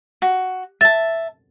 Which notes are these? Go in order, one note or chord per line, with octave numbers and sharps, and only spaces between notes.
F#4
E5 A5 A6